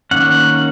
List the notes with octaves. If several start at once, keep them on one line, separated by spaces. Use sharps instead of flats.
D#3 A#3 C#4 F#5